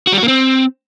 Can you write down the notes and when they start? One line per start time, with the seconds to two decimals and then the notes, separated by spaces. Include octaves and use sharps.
0.07 F#4
0.12 G3
0.18 F#4
0.23 A#3
0.28 C4